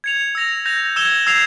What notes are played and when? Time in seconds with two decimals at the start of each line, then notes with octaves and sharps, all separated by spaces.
0.04 G#6 C#7 F7
0.35 E6 A#6 F7
0.66 G6 A#6 F7
0.96 E6 G#6 E7 G7
1.26 E6 G#6 C7 F7